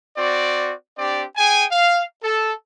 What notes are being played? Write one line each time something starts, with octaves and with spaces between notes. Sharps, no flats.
C4 F#4 D5
C4 D4 G4 D5
G#4 G5 G#5
F5
A4